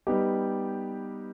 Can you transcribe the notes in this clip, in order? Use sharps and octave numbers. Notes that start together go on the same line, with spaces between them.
G3 B3 D#4 G4